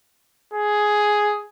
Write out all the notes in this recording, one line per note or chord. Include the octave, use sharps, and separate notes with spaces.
G#4